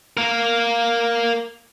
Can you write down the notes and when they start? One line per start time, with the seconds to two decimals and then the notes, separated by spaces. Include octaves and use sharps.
0.17 A#3 A#4